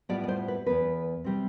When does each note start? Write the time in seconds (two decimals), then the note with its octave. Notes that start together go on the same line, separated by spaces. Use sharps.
0.09 A2 G3 B3 F4 D5
0.24 D5
0.28 C5
0.48 B4
0.66 E2 B2 B3 B4
1.24 C3 G3 C4